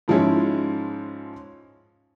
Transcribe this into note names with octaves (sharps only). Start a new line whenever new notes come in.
G#2 F3 G#3 C#4 E4